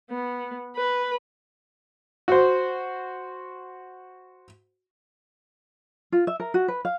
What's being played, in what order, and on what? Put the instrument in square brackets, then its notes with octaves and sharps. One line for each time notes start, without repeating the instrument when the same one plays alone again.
[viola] B3
B4
[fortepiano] F#4 C5
[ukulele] F4
E5
A#4
F#4
B4
F5